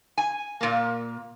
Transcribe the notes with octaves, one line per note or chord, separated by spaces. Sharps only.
G#5
A#2 A#3